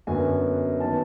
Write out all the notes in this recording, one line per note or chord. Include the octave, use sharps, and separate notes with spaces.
F#2 D3 F#3 B3 G#5
D#3 F#3 B3 A5